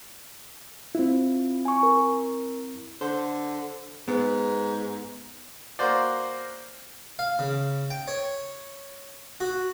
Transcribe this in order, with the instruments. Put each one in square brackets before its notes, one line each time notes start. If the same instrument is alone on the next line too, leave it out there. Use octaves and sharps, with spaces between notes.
[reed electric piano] C4 E4 [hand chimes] F4
[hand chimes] G#5 C#6
A#4
[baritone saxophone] D3 [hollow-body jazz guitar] C5
[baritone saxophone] G#2 [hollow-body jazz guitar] B3
[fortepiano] A#3 F#4 C5 D5
[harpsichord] F5
C#3
G5
C#5
F#4